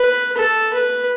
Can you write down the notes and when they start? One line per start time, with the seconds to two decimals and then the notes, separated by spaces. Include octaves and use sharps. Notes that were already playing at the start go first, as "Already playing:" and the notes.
Already playing: B4
0.37 A4
0.73 B4